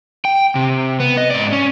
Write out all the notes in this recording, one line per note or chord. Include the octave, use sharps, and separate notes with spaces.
G5
C3
B3
D#5
G#2 D5
C#4